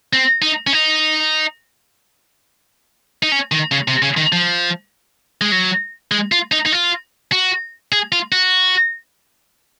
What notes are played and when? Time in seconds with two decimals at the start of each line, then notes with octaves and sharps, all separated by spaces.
0.13 C4
0.42 D#4
0.67 C#4
0.73 D#4
3.23 D#4
3.32 C#4
3.52 D#3
3.72 C#3
3.88 C3
4.02 C#3
4.17 D#3
4.32 F3
5.41 G#3
5.52 F#3
6.11 G#3
6.32 F4
6.52 D#4
6.66 D#4
6.72 F4
7.32 F#4
7.92 G#4
8.12 F4
8.32 F#4